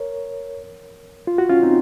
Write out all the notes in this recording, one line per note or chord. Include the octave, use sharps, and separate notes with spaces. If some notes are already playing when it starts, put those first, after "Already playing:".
Already playing: A#4 C#5
F4
F#4
C#4 F4
C4 D#4